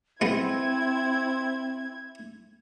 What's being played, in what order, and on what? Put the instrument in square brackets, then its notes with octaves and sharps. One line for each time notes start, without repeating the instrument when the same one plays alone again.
[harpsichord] G#3 B3 [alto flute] C4 [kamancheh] E4 [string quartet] G#6